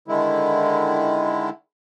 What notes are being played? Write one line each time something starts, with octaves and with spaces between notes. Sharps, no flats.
D3 D#3 G#3 E4